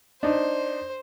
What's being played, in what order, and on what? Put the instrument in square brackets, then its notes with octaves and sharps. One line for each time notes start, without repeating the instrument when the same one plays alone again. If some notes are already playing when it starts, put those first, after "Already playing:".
[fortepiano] D4 D#4 [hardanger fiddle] C5